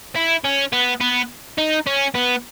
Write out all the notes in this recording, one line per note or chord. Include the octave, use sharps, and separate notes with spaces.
E4
C#4
B3
B3
D#4
C#4
B3